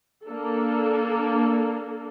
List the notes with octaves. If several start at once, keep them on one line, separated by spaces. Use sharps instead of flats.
A#3 D4 A4